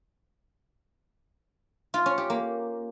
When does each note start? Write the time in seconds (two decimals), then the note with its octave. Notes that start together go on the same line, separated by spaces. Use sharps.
1.94 F4
2.06 C#4
2.18 G4
2.30 A#3